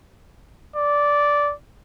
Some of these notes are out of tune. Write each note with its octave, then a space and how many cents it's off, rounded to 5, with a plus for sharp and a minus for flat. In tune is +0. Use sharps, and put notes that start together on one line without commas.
D5 -10